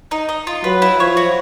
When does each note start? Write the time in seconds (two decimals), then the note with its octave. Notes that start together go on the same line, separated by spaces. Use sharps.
0.11 D#4
0.29 D#5
0.47 F4
0.64 F#3 B4
0.82 E4
0.99 F3 C#5
1.17 F#4